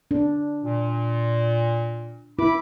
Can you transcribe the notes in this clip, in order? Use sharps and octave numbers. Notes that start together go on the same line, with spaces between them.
D4
A#2
E4 B5 D6